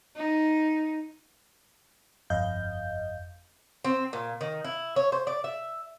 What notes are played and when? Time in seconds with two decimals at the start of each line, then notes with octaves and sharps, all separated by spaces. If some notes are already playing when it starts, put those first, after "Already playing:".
0.16 D#4
2.30 G1 F2 D#5 F5 G6
3.84 C4
4.13 A#2
4.41 D#3
4.64 E4
4.96 C#5
5.12 C5
5.27 D5
5.44 E5